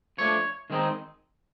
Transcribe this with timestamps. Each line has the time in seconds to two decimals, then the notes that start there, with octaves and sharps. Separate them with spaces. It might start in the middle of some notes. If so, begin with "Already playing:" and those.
0.18 F3 A3 D4 C#5
0.70 D#3 G#3 C4 D#4